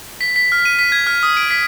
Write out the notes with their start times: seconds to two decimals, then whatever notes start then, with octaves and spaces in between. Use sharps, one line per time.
0.21 B6
0.36 B6
0.52 F6
0.65 D#7
0.79 B6
0.92 G#6
1.07 F6
1.23 D#6
1.37 D7
1.51 B6